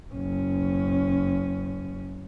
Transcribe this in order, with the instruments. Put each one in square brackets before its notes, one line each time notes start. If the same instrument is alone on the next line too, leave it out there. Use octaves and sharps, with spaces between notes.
[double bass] F#1 C#4